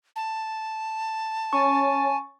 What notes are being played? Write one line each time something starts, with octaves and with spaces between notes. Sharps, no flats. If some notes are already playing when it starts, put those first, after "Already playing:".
A5
C#4 G#5 C#6 A6